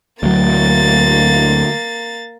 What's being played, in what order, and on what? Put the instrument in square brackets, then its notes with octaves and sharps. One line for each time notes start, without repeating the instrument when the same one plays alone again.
[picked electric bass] D2 F#3 [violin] A#3 A6